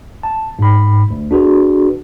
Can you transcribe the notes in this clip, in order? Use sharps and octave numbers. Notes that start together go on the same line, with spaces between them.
A5
G#2 B5
D2
D4 F#4 G#4 B4